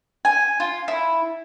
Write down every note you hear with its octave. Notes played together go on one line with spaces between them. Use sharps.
G#5
F4
E4